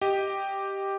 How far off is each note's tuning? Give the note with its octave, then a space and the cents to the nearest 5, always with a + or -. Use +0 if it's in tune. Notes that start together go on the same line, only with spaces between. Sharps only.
G4 +0 D#5 +0